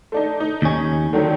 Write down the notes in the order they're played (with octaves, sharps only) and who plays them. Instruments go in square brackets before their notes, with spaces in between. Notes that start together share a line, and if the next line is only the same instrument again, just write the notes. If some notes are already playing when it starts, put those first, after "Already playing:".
[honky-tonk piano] A3 D4 D#4
D#4
[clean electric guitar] D#2 C#4
[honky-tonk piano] D3 D#3 F#3